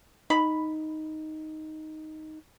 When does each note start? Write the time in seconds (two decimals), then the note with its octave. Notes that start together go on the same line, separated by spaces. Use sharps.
0.30 D#4 B5